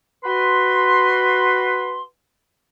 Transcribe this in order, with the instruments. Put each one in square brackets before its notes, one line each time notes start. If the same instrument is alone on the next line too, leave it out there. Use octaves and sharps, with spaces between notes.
[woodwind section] F#4 B4 C6